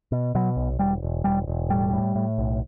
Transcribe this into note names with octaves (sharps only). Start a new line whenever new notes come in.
B2
B2 F#3
B1
E1 G3
E1
E1 G3
E1
A2 G3
A2
A2
B1